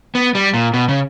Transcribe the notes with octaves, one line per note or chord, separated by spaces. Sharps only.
B3
G3
A#2
B2
C#3